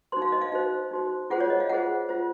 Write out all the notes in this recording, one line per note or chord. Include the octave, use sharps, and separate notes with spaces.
D#4 F#4 C5 C6
F5
D#5
F5
D#4 F#4 C5 F5
D#4 F#4 C5
F4 G#4 C5 F#5
C#5
D#5
F5
F4 G#4 C5 F#5
F4 C5